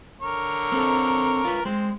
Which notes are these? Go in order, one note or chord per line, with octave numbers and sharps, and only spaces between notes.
D3 A#4 C#5
C4 A4
F4 B4
G#3 C4